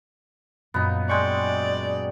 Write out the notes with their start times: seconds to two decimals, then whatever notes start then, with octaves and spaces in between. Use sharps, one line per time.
0.74 F#2 A#2 B3 D#4
1.09 G#3 D5 G5 C#6